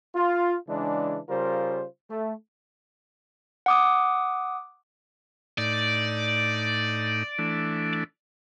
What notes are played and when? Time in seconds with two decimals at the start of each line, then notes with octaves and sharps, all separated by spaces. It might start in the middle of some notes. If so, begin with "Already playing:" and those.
0.15 F4
0.68 C#3 E3 G#3 D4
1.29 C#3 G3 F4 A#4 C5
2.10 A3
3.66 F#5 D6 D#6
5.58 A2 D#4 D5
7.39 E3 A3 D4